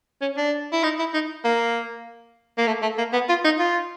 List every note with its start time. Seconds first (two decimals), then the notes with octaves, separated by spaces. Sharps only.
0.22 C#4
0.37 D4
0.73 E4
0.84 D#4
0.99 E4
1.14 D#4
1.45 A#3
2.58 A#3
2.67 A3
2.82 A3
2.98 A#3
3.13 B3
3.29 F4
3.44 D#4
3.59 F4